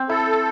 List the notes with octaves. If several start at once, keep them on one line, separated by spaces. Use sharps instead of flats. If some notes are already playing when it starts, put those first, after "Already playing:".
Already playing: C4
E4 A4